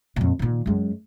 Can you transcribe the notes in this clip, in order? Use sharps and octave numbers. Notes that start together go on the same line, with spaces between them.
F2 A#2
A#2 D#3
F#2 G#3